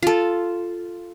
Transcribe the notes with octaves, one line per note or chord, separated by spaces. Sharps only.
F4 A4